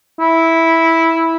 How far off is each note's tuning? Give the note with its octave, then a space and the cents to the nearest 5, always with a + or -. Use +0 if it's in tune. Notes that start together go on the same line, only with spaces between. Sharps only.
E4 -10